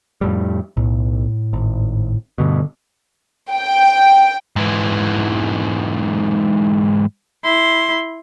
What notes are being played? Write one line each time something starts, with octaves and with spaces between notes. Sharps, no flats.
F2 A2 G3
B1 A2
G#1
G2 B2 D3
G5
G#2 E3
E4 C6